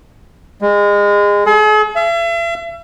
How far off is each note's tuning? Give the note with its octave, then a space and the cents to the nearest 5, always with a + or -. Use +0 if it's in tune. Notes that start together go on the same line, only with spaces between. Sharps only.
G#3 -25
G#4 +45
E5 +40